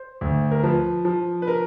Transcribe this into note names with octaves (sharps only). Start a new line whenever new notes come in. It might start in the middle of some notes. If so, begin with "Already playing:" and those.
Already playing: C5
D2
A#4
F3 B4
F3
B4
A#4